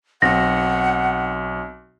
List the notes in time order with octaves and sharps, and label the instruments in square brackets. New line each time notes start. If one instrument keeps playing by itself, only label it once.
[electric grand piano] B1 C4 [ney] F#5 [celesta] A#6